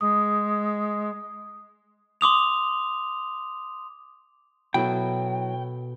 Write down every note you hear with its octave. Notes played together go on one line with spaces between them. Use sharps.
G#3 D#6
C6 D6 D#6 F7
B2 F#3 E4 A4 G5